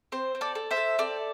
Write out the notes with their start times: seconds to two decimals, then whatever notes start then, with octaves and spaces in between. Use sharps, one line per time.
0.12 C4 C5
0.35 C4
0.41 A4 D5
0.55 A4
0.71 C5 E5
0.77 A4
0.98 C4 A4 D5